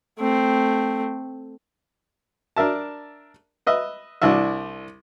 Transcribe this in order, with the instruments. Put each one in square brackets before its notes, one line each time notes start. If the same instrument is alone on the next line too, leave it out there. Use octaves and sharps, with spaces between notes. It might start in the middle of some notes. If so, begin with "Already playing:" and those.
[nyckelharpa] A3 C4
[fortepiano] D4 A#4 E5 A5
B4 D#5 E5
C2 D4 E4 E5